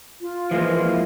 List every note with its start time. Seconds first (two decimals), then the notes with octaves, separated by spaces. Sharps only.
0.21 F4
0.51 E3 F3 G#3 A#3